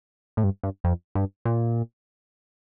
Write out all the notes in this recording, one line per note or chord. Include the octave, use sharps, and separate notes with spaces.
A2
G2
G2
F2
G2
A#2